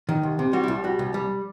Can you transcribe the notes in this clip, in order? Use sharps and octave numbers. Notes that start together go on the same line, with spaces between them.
D#3
C2
C3
G3 F#4
E4
C2
G3 F#4
C2
G3